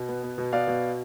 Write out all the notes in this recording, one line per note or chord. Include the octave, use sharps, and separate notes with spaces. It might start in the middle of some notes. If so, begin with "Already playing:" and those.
Already playing: B2
B3
B3
B2
B3 D5 F5
B2